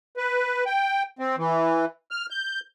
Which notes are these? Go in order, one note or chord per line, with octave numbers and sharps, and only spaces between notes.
B4
G5
C4
E3
F6
G6